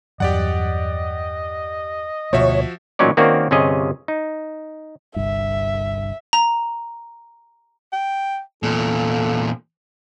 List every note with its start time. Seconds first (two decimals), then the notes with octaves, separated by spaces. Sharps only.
0.20 E2 G2 F#3 G4 D5 D#5 F#5
2.33 D2 B2 F3 A#3 F#4 C#5 E5
2.99 A1 A#2 F#3 C#4 D#4 D5
3.17 D#3 A#3 C4 C#4 F#4 D5
3.51 G1 C3 C#4 G#4 D#5
4.08 D#4
5.16 G1 C2 G2 E5
6.33 A#5
7.93 G5
8.63 E2 A#2 A4